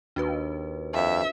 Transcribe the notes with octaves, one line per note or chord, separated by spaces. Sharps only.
D#2 D4 F#4 B4
F2 E5